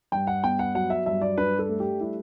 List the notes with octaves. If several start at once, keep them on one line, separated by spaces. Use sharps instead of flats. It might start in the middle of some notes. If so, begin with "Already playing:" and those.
G2 G5
F#5
B3 G5
F#5
F#3 F#5
E5
G2 E5
D5
D4 B4
A4
A3
G4
G3 E4